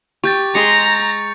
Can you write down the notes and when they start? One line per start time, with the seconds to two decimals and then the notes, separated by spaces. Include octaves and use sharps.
0.24 G4 C#6 G6 A6
0.55 G#3 G#4 A#5 C6 C#7